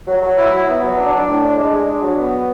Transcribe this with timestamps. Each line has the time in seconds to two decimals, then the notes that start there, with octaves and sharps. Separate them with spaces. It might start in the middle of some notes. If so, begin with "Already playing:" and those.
0.07 F#3
0.21 F#3
0.36 E4
0.52 F#3
0.67 B3
0.82 F#3
0.97 D4
1.12 D4
1.27 A2
1.42 D4
1.57 G#3
1.72 G#3
1.88 D4
2.02 F#3
2.17 B3